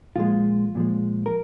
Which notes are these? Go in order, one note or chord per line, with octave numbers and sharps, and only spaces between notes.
A#2 F3 G#3 F4
A#2 F3 G#3
A#4